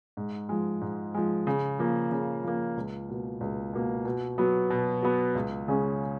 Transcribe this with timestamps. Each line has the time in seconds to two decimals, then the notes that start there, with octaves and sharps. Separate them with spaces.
0.17 G#2
0.49 F3 G#3
0.81 G#2
1.14 F3 G#3
1.47 C#3
1.79 F3 A#3
2.12 C#3
2.44 F3 A#3
2.77 C#2
3.09 B2 A#3
3.41 C#2
3.73 B2 A#3
4.05 B2
4.38 F#3 B3
4.70 B2
5.02 F#3 B3
5.35 C#2
5.68 C#3 G#3 C#4